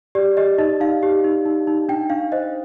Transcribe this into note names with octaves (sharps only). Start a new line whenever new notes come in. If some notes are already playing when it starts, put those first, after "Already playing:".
G4 D5
G4 D#5
D#4 D#5
D#4 F5
G4
D#4
D#4
D#4
D4 G5
D4 F5
C5 D#5